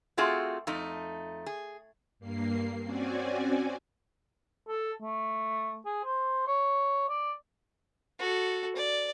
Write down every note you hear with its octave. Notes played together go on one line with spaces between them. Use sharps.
A3 C4 F4 F#4 G#4 E5
F2 A3 D#4
G#4
G2 A#3 C7
C4 C#4 F#4 D5 G#5
A4
A3
G#4
C5
C#5
D5
F#4 A4
D5